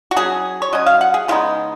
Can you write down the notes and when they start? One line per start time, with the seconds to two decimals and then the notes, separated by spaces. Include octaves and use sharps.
0.11 F#4
0.16 F#3 C#4 G#4
0.62 C#5
0.73 F#3 C#4 D#5
0.86 F5
1.01 F#5
1.14 G#4
1.28 C#3 G#3 B3 D#4 F4